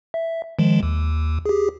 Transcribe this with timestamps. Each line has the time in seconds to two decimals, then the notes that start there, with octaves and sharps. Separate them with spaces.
0.14 E5
0.59 D#3 F3 G#3
0.83 D#2
1.46 G4 G#4